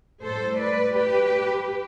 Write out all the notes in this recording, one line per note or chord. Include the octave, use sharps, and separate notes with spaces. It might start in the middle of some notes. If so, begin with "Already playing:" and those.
A2 G3 A4 C5
B4 D5
G4 B4